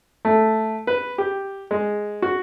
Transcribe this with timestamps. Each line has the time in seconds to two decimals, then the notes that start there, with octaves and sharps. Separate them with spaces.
0.25 A3
0.87 B4
1.18 G4
1.71 G#3
2.22 F#4